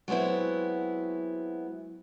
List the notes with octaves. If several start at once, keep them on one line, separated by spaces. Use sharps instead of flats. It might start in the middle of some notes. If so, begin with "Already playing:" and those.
F#3 G#3 B3 C4 E4